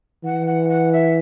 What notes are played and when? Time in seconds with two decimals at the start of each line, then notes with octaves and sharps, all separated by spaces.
0.24 E3 F#5
0.46 F#5
0.69 F#5
0.92 E5